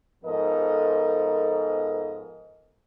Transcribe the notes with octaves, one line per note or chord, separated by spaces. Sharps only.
G#2 F3 B3 A4 A#4 D#5